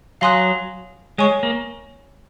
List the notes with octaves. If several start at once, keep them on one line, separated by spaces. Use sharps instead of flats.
F#3 F5 G#5 C6 D#6 F#6
G#3 C#5 G#5 C#6
A#3